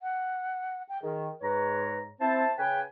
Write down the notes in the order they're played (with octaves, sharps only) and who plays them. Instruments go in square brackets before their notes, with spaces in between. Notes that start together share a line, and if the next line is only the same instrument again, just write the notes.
[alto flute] F#5
G5
[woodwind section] D#3 [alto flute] G#4
[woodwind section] G#2 C#5 A#5 [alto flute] B4
[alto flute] C4 [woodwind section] E4 C5 A5
[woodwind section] C#3 B4 G#5 [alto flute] G5